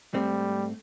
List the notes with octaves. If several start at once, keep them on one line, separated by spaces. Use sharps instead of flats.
G#2 G3 A3 C4